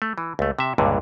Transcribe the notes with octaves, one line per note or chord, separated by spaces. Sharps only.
A3
E3
C#2 A3
C3 E5
C#2 G2 A#2 D3